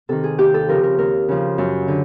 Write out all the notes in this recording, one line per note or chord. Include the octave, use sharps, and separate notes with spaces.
C3 D#3 A4
G#4
D#2 G4
A4
C#3 F3 A#4
A#4
D#2 A#4
C#3 F3
F#2
D3